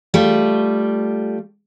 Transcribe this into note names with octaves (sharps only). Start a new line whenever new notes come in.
G3 A3 F4